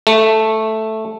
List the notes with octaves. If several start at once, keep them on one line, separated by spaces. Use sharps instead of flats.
A3